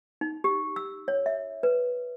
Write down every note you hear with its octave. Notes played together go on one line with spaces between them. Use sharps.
D#4
G4
E6
C#5
E5
B4